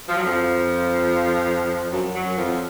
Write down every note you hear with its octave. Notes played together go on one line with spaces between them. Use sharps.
F3
F#3
F2 F3
F#2 F#3
F#2 F#3
F2 F3